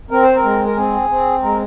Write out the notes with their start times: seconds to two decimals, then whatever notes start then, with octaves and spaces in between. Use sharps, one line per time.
0.11 C4 A#4
0.23 C5
0.36 A#4
0.43 G#3
0.65 A#4
0.76 C4 G#4
1.09 C4
1.42 G#3 A#4